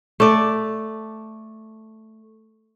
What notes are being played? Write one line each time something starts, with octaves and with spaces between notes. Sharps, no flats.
A3 D5